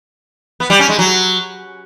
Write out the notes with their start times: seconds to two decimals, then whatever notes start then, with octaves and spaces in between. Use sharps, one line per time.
0.60 B3
0.70 G3
0.79 C#4
0.89 G#3
0.99 F#3